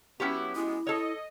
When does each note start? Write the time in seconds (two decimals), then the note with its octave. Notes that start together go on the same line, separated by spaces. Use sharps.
0.20 F#3 B3 C#4 E4 F#4 G4
0.56 G#3 B3 E4
0.87 A4 C#5 D#5